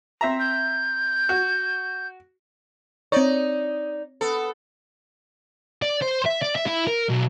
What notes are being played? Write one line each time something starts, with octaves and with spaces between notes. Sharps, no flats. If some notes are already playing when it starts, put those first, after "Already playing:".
C4 E5 A#5
G6
F#4
C4 D#4 C#5 D5
B3 A4
D5
C5
E5
D5
E5
E4
A#4
B1